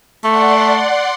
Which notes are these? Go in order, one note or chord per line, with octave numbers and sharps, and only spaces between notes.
A3 D5 F#5 C6